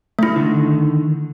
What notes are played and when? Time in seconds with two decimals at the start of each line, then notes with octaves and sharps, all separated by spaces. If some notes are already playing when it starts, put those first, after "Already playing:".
0.19 A3 E4
0.36 D3 D#3